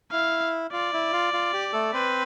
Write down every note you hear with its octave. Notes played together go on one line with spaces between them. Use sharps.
E4 F5
F4 D5
E4
F4
F4
G4
A3 A4
C4 B4 C5